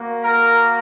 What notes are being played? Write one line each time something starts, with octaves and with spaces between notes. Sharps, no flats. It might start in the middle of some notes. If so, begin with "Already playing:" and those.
Already playing: A#3 F#4
A#4 A#5